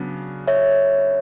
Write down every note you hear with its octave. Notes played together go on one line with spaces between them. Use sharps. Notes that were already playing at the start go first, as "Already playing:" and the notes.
Already playing: C#3 F#3 B3 D4
C#5 E5